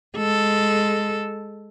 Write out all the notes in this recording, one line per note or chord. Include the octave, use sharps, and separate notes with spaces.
G#3 A4